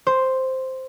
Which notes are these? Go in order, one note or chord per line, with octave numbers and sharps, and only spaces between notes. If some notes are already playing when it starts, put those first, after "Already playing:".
C5